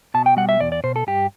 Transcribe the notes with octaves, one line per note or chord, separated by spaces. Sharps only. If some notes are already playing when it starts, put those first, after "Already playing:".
B2 A5
G5
G3 F#5
E5
E2 D5
D5
B2 C5
A4
G2 G4